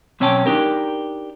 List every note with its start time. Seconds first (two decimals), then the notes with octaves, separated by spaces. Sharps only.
0.20 B1 C4 C#4 C#5 G5 A5
0.46 D4 D#4 G4 A#4